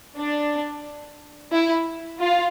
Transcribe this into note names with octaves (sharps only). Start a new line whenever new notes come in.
D4
E4
F4